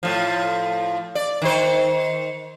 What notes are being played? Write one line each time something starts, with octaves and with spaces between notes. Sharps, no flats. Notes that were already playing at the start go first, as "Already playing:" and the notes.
A2 F3
D5
D#3 C5